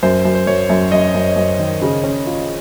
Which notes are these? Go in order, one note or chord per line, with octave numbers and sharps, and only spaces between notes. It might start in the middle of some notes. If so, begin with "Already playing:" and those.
F#2 C5
F#2
C5
F#2 C#5
F#2
F#2 D#5
F#2
F#2
D#3
C#3
C#4
F4